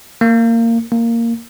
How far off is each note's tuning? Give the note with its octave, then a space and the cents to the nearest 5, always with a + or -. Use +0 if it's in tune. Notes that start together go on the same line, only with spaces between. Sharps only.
A#3 -20
A#3 -10